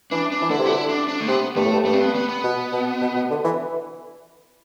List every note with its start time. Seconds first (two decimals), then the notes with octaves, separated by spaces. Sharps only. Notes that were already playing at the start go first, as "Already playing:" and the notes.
0.11 E3 D4
0.32 D4
0.42 E3
0.50 D3 E4
0.59 C3
0.66 F#4
0.68 D3 E4
0.89 D4
1.08 D4
1.20 A3
1.27 C3 B3
1.56 G2 A3
1.64 A2
1.73 G2
1.85 G2 A3
1.93 C4
2.00 B3
2.15 B3
2.29 B3
2.43 B2
2.72 B2
3.01 B2
3.16 B2
3.30 D3
3.44 E3